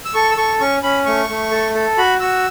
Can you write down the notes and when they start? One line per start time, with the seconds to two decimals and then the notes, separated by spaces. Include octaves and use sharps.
0.05 E6
0.14 A4 C#6
0.31 E6
0.37 A4 C#6
0.60 C#4 C#6
0.83 C#4 B5
1.06 A3 C#6
1.29 A3
1.51 A4
1.75 A4
1.98 F#4 B5
2.20 F#4 E6